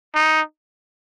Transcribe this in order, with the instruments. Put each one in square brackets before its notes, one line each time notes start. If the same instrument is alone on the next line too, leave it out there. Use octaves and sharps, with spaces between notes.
[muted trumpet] D#4